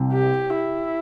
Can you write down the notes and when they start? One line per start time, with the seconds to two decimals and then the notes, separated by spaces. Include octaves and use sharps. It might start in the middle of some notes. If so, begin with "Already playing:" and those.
Already playing: C2 C3
0.13 G4
0.56 E4